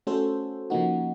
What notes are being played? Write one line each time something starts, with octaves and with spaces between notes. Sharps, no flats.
A3 C#4 F#4 A4 C5
C#3 F3 A#3 D#4 F#4 F#5